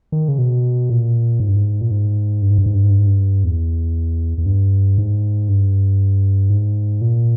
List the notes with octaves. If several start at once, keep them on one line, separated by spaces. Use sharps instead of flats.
D#3
C#3
B2
A#2
G#2
G2
G#2
A#2
G#2
G2
G#2
G2
G#2
G2
G#2
G2
G#2
G2
E2
E2
G2
G#2
G2
G#2
A#2